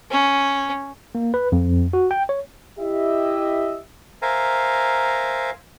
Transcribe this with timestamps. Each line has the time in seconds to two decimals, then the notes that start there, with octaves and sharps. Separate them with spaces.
0.11 C#4
1.15 A#3
1.34 B4
1.52 F2
1.93 F#4
2.11 G5
2.29 C#5
2.79 E4 G4 D#5 E5
4.22 A#4 C5 E5 F5 G#5 A#5